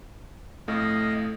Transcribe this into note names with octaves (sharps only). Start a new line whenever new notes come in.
F2 A2 A3 D#5 F5